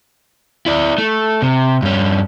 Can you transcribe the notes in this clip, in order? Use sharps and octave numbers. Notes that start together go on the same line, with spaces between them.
E4 D5
A3
C3
G2 C#4